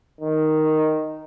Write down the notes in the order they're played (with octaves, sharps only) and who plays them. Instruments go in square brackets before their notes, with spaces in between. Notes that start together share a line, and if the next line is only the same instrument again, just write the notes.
[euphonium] D#3